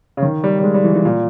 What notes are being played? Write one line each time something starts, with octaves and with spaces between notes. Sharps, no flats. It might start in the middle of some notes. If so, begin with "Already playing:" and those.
C#3
D#3
G3
G3
G#3
G3
E3
E3
A#2